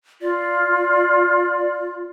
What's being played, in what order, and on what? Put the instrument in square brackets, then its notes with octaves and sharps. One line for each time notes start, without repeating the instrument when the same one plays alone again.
[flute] F4 [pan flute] D5